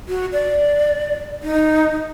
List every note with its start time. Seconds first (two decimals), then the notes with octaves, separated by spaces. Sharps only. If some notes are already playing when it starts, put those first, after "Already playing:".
0.09 F#4
0.32 D5
1.43 D#4